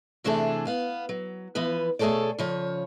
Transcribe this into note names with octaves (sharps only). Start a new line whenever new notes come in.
C3 E3 A3 D4 G#4 A4
B3 F5
F#3
E3 F3 B3 B4
B2 A3 G#4 A4 C#5 D5
C#3 F3 C#5